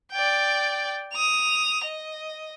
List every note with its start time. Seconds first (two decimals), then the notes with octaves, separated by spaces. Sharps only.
0.12 D5 G5
1.13 D#6 F7
1.84 D#5